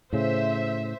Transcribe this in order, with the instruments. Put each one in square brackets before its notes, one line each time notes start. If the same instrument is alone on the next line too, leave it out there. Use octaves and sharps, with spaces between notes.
[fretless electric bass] A2 C#3 [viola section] C5 E5